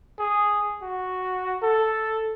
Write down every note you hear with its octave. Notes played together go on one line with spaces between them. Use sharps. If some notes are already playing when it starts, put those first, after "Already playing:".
G#4
F#4
A4